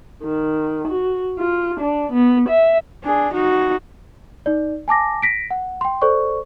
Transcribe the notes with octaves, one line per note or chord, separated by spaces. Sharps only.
D#3
F#4
F4
D4
B3
E5
D4 G#4
D#4 F#4
D#4 D5
G#5 A5 D6 A#6
A#6 B6 D7
F#5
G5 C6
A4 C5 D5 C#6